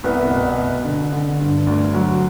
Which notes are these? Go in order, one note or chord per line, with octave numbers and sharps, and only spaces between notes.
C2 B3
B2
B2
D3
D3
G2
D2
F#3